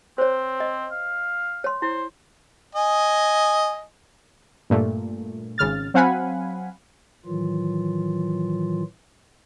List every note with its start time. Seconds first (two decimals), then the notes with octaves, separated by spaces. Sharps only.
0.18 C4 C5 C#5
0.60 D#5
0.91 F5
1.64 C#5 C6
1.82 E4 C5
2.75 D#5 G#5
4.70 G2 A#2 A3
5.58 G#1 C#3 F6 A6
5.94 F#3 C4 F5 F#5 G#5 B5
7.26 A2 D#3 E3 F#3 F4